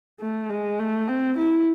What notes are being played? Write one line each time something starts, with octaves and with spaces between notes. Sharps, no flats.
A3
G#3
A3
C4
E4